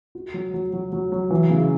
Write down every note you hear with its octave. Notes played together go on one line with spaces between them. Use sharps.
F#4
F#3
F#3
F#3
F#3
F#3
E3
C#3